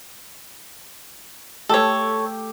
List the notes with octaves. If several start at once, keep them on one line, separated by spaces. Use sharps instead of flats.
A3 G4 A4 C#5